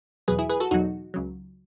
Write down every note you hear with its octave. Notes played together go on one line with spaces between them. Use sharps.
E2 B2 F#3 G#4 B4
E4 G#4
G#4 B4
F#4 A4
E2 B2 F#3 D#4 F#4
C#2 C#3 F#3